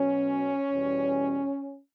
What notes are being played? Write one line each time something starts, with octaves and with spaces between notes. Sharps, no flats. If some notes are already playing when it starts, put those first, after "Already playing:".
Already playing: B2 F#3 C#4
E2 B2 G3